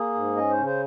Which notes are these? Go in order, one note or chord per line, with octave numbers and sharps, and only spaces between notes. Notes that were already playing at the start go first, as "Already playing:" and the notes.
Already playing: A#3 G#4
G#2
C#4 D#5
C5
C#3
C5